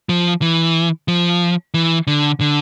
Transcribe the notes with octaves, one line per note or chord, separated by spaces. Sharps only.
F3
E3
F3
E3
D3
D3